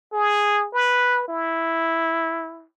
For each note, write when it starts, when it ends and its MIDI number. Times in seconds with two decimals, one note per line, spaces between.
0.13 0.68 68
0.74 1.27 71
1.28 2.66 64